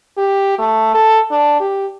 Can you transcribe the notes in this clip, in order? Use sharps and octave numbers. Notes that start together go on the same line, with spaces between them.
G4
A3
A4
D4
G4